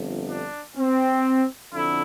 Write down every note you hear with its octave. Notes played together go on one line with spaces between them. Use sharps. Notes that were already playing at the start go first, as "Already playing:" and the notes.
Already playing: G1 F2 D3
D4
C4
F2 D3 E4